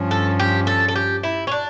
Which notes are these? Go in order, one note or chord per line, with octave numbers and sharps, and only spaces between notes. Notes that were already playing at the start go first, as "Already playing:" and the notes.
Already playing: G2 F3 C#4
A4
G4
A4
A4
G4
E4
C#4
D4